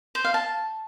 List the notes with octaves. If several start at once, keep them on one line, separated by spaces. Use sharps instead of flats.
C5
F5
A5